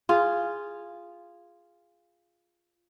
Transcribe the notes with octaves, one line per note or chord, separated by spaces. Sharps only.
F4 G#4